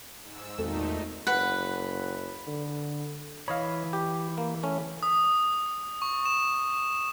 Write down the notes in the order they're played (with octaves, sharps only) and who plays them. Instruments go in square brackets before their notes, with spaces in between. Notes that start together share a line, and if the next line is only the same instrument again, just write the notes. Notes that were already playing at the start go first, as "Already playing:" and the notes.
[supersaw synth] G#2 E6
[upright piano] G#1 [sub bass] E2 [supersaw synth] A#2 A3 D#4 [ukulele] A4
[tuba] F#1 [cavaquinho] B4 F#5
[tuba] D3
[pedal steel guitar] E3 B5 [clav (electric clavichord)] C#5 D#5 F5
[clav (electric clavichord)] G4
A#3
A3 C#4
[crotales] D#6
C#6
E7